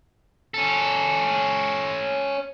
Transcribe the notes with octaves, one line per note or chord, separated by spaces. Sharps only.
C#4 A4